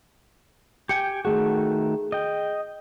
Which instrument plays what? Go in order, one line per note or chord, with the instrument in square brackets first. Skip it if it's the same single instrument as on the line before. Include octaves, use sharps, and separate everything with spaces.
[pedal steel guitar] G4 G5 G#5 [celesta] C#7
[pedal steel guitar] D#3 A3 F#4 [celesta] G#4
[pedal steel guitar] D#5 G5